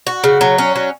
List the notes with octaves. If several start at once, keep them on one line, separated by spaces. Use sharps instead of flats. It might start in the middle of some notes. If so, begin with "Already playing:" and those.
F#4
C#3
F#3
C#4
F#3